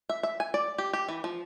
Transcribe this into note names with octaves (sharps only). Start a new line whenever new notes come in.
E5
E5
G#5
D5
G4
G4
E3
F3